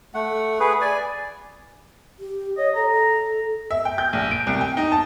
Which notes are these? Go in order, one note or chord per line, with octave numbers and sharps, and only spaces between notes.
A3 F#5
G#4 B4
D5 G#5
G4
C#5 D#5
A4 A#5
E5
G5
G6
A#1
D7
C2
G5
D#4
A5